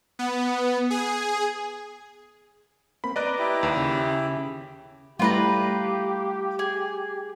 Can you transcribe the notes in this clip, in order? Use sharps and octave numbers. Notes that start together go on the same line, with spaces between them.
B3
G#4
A#3 C4 B5
B4 D5 D#5 A#5 D6 F#6
E4 G4
D#2
C#3
G3 A3 E4 F4 G4 B4 A#5
G#4